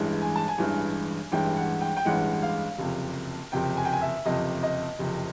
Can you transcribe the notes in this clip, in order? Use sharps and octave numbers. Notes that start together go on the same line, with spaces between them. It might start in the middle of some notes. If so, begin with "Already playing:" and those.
Already playing: A1 G2 E3 G#3
G#5
A5
G#5
A1 G2 E3 G#3
A1 G2 E3 G#3 G5
F#5
G5
G5
A1 G2 E3 G#3 F#5
F5
F#1 F2 C3
F#1 F2 C3 G5
G#5
G5
G#5
E5
F#1 F2 C3 D#5
D#5
F#1 F2 C3